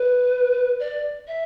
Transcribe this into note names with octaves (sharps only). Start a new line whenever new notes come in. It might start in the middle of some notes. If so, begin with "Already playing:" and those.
Already playing: B4
D5
E5